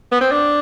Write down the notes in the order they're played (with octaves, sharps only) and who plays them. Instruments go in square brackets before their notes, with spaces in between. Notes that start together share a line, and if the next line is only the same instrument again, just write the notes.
[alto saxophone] B3
C4
D4